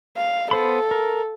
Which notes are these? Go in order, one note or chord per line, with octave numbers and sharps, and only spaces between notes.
F5
B3 A4 C5 B5
A#4